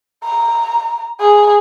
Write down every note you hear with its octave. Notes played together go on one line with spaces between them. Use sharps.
A#5
G#4